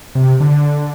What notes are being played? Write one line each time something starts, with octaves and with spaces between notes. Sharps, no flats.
C3
D3